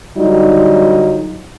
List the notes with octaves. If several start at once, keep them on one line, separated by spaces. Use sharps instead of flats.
D3 F#3 G3 D#4 F4